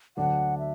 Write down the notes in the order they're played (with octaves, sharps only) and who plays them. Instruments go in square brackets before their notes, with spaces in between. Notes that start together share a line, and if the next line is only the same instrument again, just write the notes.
[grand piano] D2 D3 F#3 D4 [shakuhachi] F#5
[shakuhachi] E5